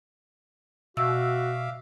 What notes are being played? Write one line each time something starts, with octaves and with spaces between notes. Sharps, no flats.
B2 F#4 E5 F5 D6 E6